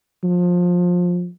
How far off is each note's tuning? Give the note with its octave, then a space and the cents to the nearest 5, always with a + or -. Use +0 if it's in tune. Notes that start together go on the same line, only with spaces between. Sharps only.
F3 +25